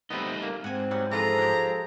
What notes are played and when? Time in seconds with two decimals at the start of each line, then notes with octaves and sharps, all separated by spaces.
0.10 G3 A3 B3 C4 D#4 B4
0.43 A#3
0.64 G#2 C4 F#5 G#5
0.91 F#3 G3 F#5
1.12 E3 F3 F4 G#4 A4 B4 A#5
1.38 G#3 G4